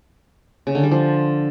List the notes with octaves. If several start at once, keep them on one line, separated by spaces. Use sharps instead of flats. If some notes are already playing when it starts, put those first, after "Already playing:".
C#3
D3
G3
F3